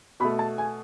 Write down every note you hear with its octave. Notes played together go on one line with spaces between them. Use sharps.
B2 A3 B5
A5
G#5